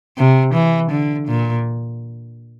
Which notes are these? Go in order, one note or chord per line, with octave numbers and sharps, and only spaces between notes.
C3
E3
D3
A#2